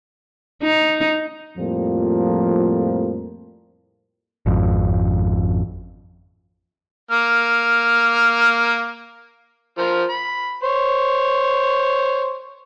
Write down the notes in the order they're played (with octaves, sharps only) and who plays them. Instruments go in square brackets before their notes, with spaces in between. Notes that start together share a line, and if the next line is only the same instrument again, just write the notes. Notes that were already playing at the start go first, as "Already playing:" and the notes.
[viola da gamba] D#4
[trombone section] F2 A2 F3 G3 A#3
[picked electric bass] G#1 F2
[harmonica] A#3 F6
F3 A#4 C5
B5
C5 C#5